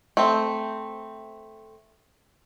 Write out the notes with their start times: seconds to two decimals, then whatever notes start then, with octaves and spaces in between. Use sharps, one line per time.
0.17 A3 C4